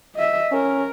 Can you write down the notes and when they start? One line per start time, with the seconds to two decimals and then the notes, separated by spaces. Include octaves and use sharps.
0.15 D#5 E5
0.52 C#4 A#4